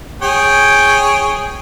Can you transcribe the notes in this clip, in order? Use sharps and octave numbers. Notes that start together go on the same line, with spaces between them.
G#4 C#5 G5